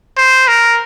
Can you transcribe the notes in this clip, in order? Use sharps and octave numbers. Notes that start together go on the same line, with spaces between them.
C5
A#4